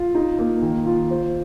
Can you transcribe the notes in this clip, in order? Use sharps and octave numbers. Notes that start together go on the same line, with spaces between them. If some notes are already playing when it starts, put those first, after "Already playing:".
Already playing: F4
D#4
A#3
D#3
F4
C5